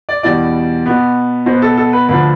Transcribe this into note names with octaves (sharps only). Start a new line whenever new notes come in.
D5
E2 B2 G3 D5
B2 B3
B2 B3 C5
A4
A4
B4
D2 D3 F3 B4